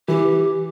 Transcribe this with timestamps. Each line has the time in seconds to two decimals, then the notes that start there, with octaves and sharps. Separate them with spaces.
0.08 E3 G4